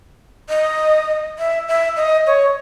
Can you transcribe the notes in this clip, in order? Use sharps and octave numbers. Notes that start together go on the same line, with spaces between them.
D#5
E5
E5
D#5
C#5